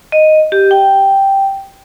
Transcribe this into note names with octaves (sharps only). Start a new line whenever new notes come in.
D#5
G4
G5